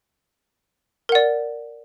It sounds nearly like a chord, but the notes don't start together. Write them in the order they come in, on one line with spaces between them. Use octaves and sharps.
A#4 F#5 D5